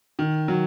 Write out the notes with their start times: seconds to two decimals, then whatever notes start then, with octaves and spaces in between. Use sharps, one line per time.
0.19 D#3
0.48 F#3